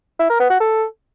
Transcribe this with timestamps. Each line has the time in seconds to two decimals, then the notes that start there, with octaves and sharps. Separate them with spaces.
0.19 E4
0.30 A#4
0.40 B3
0.50 F#4
0.60 A4